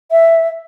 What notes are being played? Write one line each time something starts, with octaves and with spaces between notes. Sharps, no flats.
E5